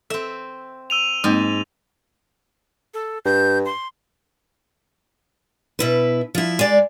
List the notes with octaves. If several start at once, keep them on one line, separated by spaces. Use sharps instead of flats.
C4 A4 E5
E6 D#7 F7
G#2 G#3 A#3 C4
A4
G2 G6
C6
B2 E4 B4
F3 E4
G#3 D5